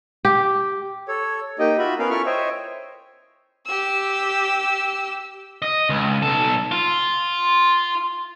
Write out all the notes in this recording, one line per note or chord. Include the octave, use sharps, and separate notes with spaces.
G4
A4 C#5
A#3 D#4 G4 D#5
F4 F#4 E5 B5
B3 C#4 A#4 F5
E4 F4 A4 A#4 C#6 F6
C5 C#5 D#5 E5 G5
G4 E6
D#5
C#2
B1 A4
F4